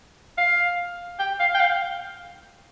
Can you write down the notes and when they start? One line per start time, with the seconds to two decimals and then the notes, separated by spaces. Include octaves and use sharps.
0.38 F5
1.19 G5
1.40 F5
1.54 G5
1.60 F5